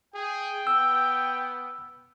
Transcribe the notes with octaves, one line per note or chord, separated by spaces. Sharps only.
G#4 G5
B3 E6